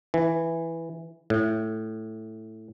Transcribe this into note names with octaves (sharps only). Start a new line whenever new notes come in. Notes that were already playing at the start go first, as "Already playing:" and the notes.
E3
A2